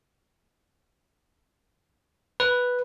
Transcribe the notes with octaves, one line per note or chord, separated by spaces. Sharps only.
B4